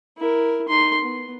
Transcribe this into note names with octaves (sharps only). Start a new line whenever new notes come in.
E4 A#4
D#4 C6
B3